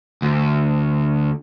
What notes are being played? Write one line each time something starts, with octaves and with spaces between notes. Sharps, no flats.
D2